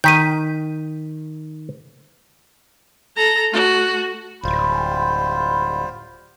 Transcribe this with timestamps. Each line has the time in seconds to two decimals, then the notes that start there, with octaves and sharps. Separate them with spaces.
0.04 D#3 G6 B6 D#7
3.16 A4 A#5
3.51 A3 F#4
4.44 D1 G3 F4 C5 B5